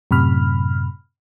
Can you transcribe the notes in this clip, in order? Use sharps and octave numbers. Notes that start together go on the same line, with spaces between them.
F#2 A2 C3 B5 F6